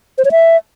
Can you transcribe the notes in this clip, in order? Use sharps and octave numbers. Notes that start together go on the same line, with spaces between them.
C5
C#5
E5